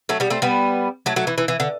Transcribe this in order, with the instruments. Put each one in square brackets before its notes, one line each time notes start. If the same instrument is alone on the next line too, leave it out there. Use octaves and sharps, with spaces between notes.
[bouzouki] F#3 A3
G3 B3
A3 C4
G3 B3
F#3 A3
F#3 A3
E3
E3
E3
D3